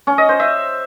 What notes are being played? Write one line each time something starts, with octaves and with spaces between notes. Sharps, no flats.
C#4
D#5
C5
E5